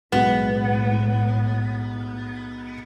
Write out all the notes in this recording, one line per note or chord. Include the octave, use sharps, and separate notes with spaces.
B1 A2 G#3 B3 F#5